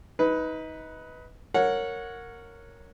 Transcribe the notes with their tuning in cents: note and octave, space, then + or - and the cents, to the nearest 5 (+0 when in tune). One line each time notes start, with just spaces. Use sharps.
D#4 +25 B4 +0
A#4 -10 C#5 +0 F#5 -20